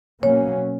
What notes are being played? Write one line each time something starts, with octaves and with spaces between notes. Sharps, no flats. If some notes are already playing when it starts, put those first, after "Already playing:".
B2 F#3 A#3 C#4 C#5